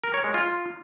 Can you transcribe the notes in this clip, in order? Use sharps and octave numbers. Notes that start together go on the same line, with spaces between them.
A#4
C#5
G#3
F4